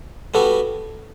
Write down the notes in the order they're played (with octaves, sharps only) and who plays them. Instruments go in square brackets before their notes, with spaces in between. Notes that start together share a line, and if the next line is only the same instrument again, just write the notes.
[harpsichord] G3 B3 F#4 [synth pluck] A4